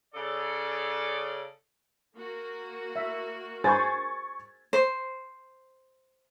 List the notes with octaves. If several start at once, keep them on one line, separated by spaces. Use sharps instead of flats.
C#3 A4 D5
A#3 F#4
E5
G#4 C5 G#5 C#6 G#6 A6
C5